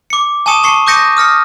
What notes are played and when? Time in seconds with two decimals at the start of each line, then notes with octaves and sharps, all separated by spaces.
0.10 D6 C#7
0.46 G#5 A5 C#6 D#6 C#7 E7
0.63 A5 C#6 C7 C#7
0.87 D6 D#6 G6 A#6 C#7 D#7
1.17 D#6 F6 A#6 C#7